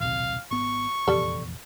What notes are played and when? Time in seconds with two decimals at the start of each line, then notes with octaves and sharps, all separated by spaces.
0.01 D#1 B1 C3 F5
0.51 G#1 B3 C#6
1.08 F1 A#1 E2 G3 A4